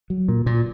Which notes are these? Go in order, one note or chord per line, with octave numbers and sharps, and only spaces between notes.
F#3
A#2
A#2